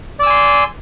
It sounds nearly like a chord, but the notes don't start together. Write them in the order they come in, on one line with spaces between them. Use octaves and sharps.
D5 E6 G#5 C6